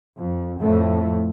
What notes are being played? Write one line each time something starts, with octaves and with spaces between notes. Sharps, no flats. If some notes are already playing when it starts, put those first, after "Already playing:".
F2
F2 A2 A3